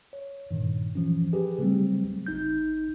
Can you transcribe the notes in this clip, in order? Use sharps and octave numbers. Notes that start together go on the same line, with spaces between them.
C#5
G2 A#2 D#3
E3 F3 C#4
G4 G#4 B4
C#3 F#3 G3 A3 C4
G1 D#4 G6